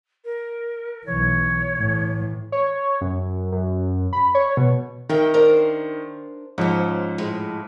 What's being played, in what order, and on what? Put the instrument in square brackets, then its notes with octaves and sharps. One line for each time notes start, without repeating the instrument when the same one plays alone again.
[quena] A#4
[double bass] B1 E3 [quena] C#5
[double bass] A2 E3
[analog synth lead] C#5
F#2
F#2
B5
C#5
B2
[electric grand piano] D#3 [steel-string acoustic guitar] A#4 E5 G5
[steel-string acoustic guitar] D4 A#4 C5
[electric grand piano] G#2 F3 [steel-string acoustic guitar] C#4 C5
[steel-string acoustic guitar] A2 G#3